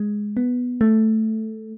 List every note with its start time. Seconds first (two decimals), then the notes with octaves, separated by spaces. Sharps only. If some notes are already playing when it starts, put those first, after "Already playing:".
Already playing: G#3
0.37 B3
0.81 A3